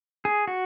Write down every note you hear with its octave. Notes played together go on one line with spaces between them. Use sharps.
G#4
F#4